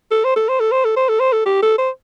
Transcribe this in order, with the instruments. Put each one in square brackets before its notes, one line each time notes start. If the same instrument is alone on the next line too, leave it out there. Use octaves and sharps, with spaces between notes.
[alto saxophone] A4
C5
A4
C5
A4
C5
A4
C5
A4
C5
A4
G4
A4
C5